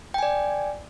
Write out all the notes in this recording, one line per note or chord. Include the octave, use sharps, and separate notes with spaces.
D5 G5 G#5